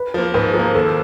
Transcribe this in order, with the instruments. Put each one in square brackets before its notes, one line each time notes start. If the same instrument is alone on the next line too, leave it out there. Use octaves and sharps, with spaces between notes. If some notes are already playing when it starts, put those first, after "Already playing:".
Already playing: [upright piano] B4
[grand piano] F3 A#3 [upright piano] C5
[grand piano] G#2 [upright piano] B4
[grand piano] F3 [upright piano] A#4
[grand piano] A#3
[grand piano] D#2 [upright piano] A4